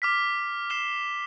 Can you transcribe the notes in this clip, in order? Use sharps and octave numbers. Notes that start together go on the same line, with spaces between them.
D6 F6 B6
F6 C7 E7 G7